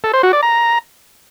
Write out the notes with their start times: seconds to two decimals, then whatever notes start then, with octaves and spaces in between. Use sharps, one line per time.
0.04 A4
0.13 C5
0.23 F#4
0.33 D5
0.43 A#5